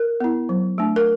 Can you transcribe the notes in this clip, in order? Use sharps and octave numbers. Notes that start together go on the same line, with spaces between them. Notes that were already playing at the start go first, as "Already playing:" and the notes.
Already playing: A#4
B3 E4
F#3
A3 D4
A#4